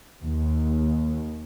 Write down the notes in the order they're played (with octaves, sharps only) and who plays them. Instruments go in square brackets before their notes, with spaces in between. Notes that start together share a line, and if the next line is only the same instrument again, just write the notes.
[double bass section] D#2